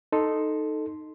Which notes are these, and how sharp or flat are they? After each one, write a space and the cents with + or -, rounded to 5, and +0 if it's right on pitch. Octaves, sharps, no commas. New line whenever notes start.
D#4 -5 A4 +0 C6 +0